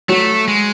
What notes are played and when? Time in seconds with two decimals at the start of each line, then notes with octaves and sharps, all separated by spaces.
0.09 F#3 A3
0.48 G#3